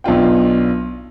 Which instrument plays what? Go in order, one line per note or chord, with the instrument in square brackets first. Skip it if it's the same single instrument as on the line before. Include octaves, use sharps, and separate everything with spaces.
[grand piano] B1 D4 F4 G5